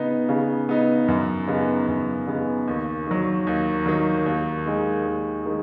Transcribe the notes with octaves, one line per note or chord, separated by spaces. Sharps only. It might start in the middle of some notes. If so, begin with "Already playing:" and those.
Already playing: C#3 B3 D#4
C#3
B3 D#4
F#2
C#3 B3 D#4
F#2
C#3 B3 D#4
D#2
D#3 F#3
D#2
D#3 F#3
D#2
D#3 G#3
D#2
D#3 G#3